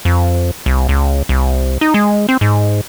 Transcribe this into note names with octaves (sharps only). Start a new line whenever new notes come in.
F2
C2
C#2
C2
D#4
G#3
C4
G#2